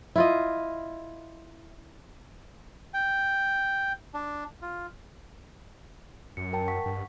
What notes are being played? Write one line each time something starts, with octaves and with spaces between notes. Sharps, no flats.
E4 F4 D#5
G5
D4
F4
F#2 C#7
A#4 G5 A5
F#5 C#6 B6
G2